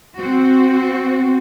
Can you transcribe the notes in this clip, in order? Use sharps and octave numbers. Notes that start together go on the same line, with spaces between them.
C4 F#4